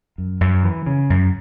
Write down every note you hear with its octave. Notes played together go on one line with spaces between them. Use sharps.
F#2
F#2
E3
C#3
F#2